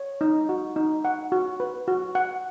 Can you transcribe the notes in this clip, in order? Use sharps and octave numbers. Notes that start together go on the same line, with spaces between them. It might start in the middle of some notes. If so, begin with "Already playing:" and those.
Already playing: C#5
D#4
F#4
D#4
F#5
F#4
B4
F#4
F#5